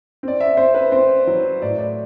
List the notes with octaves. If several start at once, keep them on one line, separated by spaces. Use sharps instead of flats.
C4 D5
E5
C4 C5
B4
C4 C5
F#3
A2 D5
D5